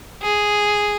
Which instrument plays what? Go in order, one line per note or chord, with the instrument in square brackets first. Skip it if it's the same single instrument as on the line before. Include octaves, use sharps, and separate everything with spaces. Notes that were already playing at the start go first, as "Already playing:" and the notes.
[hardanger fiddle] G#4